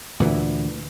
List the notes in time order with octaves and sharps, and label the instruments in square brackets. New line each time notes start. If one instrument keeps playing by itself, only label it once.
[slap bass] D2 A#2 E3